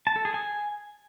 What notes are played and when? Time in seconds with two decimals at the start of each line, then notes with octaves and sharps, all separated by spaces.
0.07 A5
0.16 A4
0.25 G#4
0.34 G#5